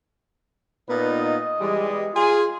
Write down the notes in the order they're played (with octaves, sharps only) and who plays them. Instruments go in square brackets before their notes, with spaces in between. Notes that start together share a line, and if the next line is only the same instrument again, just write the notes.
[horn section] A#2 B3 D#4 [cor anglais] B4
[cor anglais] D#5
[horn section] E3 G3 G#3
[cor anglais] F4 [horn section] G#4 G#5